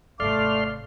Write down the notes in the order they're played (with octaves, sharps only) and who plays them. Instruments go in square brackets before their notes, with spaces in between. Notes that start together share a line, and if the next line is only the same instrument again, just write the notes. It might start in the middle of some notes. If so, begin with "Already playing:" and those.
[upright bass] G#1 C3 [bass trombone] A3 [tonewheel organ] D5 C6 F6 [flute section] F5 D6